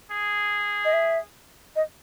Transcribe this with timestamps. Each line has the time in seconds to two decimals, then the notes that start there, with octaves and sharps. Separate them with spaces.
0.11 G#4
0.85 D#5
0.93 E5
1.76 D#5